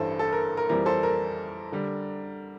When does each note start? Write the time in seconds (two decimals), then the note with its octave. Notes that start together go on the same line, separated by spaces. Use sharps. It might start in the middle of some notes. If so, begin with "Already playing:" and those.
Already playing: A1 G2 E3 A4 C5
0.19 A4
0.33 A#4
0.57 A#4
0.69 F2 E3 G3 C4 A#4
0.86 A4 C5
1.03 A#4
1.72 D3 G3